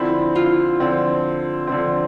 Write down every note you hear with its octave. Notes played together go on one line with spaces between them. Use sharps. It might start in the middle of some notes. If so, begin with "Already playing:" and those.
Already playing: D3 F3 C4 E4
F4
D3 F3 C4
D3 F3 C4